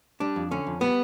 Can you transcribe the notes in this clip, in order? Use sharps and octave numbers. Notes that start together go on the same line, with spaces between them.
G3 D4
F2
D3 C#4
F2
G3 B3